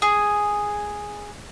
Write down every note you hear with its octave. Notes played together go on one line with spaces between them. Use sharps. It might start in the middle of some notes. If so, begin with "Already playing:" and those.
G#4